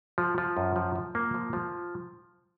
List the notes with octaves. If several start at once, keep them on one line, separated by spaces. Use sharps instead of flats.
F3
F3
F#2
F3
F3
A#3
F3
F3